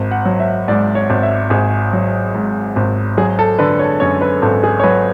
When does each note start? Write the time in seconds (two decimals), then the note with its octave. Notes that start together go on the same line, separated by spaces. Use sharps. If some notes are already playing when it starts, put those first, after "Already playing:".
Already playing: G#1
0.11 F#5
0.25 F#3
0.39 E5
0.68 G#2 D5
0.95 C#5
1.10 G#1
1.23 E5
1.50 G#1 G#4
1.93 F#3
2.34 G#2
2.76 G#1
3.17 F#3 G#4
3.39 A4
3.59 D3 B4
3.79 C#5
4.00 F#2 C#5
4.22 B4
4.42 G#1 A4
4.64 G#4
4.80 C#5
4.84 F#3 B4